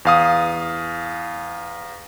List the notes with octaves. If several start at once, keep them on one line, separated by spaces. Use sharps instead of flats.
E2 F5 D#6